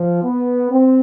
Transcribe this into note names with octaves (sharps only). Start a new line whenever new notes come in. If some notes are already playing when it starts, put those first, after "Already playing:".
Already playing: F3
B3
C4